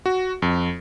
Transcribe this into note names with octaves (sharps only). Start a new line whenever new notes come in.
F#4
F2